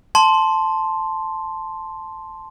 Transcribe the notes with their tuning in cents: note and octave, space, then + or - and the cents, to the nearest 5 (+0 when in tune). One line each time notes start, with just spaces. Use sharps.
A5 -5 C6 +0